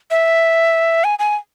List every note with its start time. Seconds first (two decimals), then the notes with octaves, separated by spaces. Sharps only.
0.11 E5
1.04 G#5
1.19 G#5